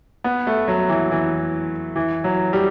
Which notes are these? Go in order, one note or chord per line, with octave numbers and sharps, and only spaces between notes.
B3
A3
F#3
E3
E3
E3
F#3
G3